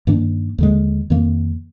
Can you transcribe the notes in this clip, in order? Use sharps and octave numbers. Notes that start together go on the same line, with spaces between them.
G2 D#3 A#3 D4
D#2 D3 G#3
F2 D#3 A#3